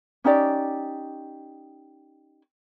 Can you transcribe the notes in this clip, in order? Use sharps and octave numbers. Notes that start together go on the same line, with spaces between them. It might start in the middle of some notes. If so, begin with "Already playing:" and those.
C#4 D#4 G4 D5